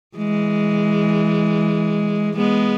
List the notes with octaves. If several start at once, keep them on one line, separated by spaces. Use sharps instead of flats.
E3 G#3
G#3 B3